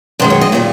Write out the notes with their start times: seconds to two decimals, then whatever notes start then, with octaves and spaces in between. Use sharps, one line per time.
0.20 F#2 D#3 G#3 C5
0.30 C#5
0.41 D#5
0.52 A#2 G3 D5